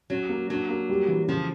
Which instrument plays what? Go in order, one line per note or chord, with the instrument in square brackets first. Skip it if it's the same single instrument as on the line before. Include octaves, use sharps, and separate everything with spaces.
[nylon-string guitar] F#3 [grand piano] C#4
[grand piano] A#3
[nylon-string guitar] F#3 [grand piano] D4
[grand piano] A#3
G3
E3
[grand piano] C#3 [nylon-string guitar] F3